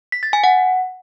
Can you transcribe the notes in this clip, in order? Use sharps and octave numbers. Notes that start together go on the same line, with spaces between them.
B6
A6
G#5
F#5